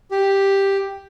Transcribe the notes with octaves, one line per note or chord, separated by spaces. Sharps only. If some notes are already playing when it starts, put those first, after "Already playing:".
G4